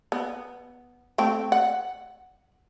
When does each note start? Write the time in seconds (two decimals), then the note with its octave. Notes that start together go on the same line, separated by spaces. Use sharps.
0.12 B3
1.18 A3 C4 G5
1.52 F#5